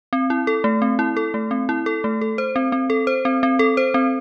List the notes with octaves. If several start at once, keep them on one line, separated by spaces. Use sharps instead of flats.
C4
E4
A4
A3
C4
E4
A4
A3
C4
E4
A4
A3
A4
C5
C4
C4
A4
C5
C4
C4
A4
C5
C4